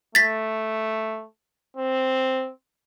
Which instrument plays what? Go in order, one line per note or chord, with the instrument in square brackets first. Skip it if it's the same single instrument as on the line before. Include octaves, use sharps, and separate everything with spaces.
[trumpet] A3 [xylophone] A6 B6
[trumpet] C4